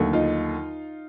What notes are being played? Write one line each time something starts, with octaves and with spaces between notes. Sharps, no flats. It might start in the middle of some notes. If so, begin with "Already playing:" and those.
Already playing: D#2 D3 F#3 A3
D#4 F4